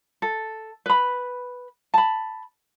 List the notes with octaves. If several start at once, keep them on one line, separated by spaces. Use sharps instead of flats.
A4
B4 B5
A5 B5